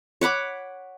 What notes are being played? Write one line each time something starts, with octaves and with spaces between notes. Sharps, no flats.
C#5 F#5 B5 D6